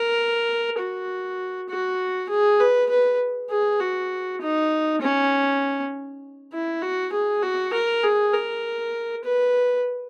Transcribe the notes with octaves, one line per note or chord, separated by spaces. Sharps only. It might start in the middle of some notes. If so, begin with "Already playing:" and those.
Already playing: A#4
F#4
F#4
G#4
B4
B4
G#4
F#4
D#4
C#4
E4
F#4
G#4
F#4
A#4
G#4
A#4
B4